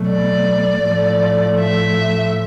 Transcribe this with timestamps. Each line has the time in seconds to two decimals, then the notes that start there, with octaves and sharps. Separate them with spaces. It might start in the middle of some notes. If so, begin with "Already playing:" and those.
Already playing: B2 F#3 A3
0.10 D5
0.84 A2 F3 A3
1.60 E5